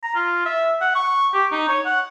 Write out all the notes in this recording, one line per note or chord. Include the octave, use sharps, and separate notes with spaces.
A#5
F4
E5
F#5
C#6
G4
D#4
C#5
F#5